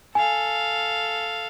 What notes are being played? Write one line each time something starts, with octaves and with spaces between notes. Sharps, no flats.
A4 F5 G#5